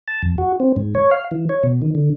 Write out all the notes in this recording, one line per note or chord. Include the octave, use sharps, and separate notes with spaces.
A5
F2
F#4
C4
G#2
C#5
F5
E3
C#5
B2
D#3
D3